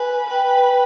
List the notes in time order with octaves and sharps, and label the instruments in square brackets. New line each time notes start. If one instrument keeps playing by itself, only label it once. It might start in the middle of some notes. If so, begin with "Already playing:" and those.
Already playing: [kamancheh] B4 [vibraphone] G#5
[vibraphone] G#5
[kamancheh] B4 [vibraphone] G5